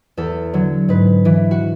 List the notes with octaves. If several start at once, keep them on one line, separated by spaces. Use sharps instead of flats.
E2 A4
D3 F#3
G#2 B4
E3
F#4